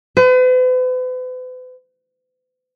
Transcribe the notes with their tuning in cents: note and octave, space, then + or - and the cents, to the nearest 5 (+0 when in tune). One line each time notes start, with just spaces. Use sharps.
B4 +45